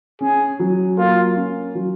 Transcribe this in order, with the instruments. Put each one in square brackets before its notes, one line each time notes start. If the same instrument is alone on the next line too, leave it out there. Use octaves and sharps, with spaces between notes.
[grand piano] C#4 [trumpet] G#4
[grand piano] F#3
[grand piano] A#3 [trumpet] F4
[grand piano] C#4
F#3